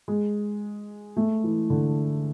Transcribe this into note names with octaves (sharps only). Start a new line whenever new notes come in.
G#3
A3
E3
D3